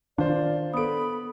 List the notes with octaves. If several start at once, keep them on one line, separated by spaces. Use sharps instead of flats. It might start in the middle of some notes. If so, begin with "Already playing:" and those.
D#3 D4 F4 C5 D5
B3 A4 B5 D#6 D7